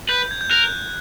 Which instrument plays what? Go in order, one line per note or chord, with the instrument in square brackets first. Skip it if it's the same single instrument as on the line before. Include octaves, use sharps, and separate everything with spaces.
[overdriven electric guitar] B4 [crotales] G6
[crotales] G#6
G6
[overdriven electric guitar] A#4 [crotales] F#6